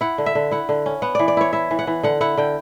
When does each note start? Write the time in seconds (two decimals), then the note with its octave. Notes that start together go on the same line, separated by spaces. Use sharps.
0.01 E4 F#5
0.18 D3
0.26 E5
0.35 D3
0.51 E4 F#5
0.69 D3
0.86 C#4
1.02 B3 F#5
1.15 E3 D5
1.28 D5
1.37 E4 C#5
1.53 E4 E5
1.71 E3
1.79 F#5
1.87 E3
2.03 D3 F#5
2.21 E4 F#5
2.37 D3 G5